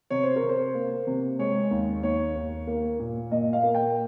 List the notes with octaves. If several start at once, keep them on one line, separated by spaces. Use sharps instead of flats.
C3 C#5
C5
A#4
C3
C5
A#3
C3
G#3 C#5
D#2
D#2 C#5
D#2
A#3
A#2
A#2 D#5
F5
A#3
G5